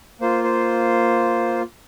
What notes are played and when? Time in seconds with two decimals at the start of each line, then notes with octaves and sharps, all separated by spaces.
0.21 A#3 F4 C5
0.44 C5